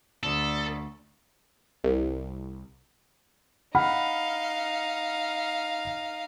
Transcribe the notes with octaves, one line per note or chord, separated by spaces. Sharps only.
D2 A4
C2
D#4 F5 F#5 B5 F6